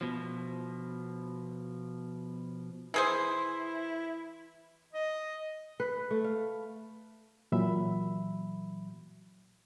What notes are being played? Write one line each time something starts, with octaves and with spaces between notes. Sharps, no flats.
B2 F3
E3 E4 G#4 C5
D#5
B4
A3
F5
A#2 E3 F#3 E5 B5